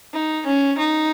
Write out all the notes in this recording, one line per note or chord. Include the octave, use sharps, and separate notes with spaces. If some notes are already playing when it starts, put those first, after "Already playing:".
D#4
C#4
D#4